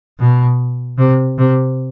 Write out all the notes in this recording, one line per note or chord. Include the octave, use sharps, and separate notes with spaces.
B2
C3
C3